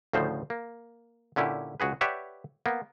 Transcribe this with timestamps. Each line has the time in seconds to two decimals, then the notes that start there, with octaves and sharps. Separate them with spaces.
0.13 D2 A2 C#3 F3 C5
0.50 A#3
1.36 A#2 D3 C#4 E4 G4
1.80 C#2 F#4 G#4 B4
2.01 G4 B4 C#5 D5 E5 F#5
2.66 A#3 B3